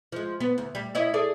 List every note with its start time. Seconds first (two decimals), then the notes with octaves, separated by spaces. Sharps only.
0.12 F3 G#3
0.40 B3
0.58 D2
0.75 G3
0.95 E4 C#5 D#5
1.14 G#4 A4 D5